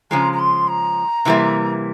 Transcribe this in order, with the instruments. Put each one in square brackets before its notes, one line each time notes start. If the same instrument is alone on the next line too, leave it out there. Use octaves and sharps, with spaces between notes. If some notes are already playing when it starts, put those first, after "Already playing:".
[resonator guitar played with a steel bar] C#3 F3 G#3 [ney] A#5
[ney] A#5
C6
A#5
[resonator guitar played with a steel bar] C3 E3 G3 A#3